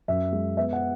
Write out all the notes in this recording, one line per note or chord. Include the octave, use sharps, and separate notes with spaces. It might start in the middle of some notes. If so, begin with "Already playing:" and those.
F#2 E5
G#3
B3 E5
F#5